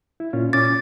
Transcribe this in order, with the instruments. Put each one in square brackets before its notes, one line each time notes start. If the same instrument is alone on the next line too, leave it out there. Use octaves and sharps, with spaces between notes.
[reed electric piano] E4
A#2 C#4 F4
[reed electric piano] A#2 C#4 D6 [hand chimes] A6